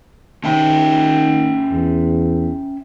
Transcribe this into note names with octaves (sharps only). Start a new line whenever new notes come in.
D#3 C#4 E5 G5
E2